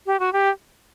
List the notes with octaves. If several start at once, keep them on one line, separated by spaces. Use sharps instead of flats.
G4
F#4
G4